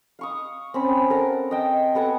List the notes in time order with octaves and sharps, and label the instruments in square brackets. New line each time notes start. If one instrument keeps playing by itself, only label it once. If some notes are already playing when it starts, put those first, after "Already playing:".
[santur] F5 C#6 D#6
C4 C#4 B5
A4 A#4 F#5
D#5 G5 A5
B3 A4 F#5 G#5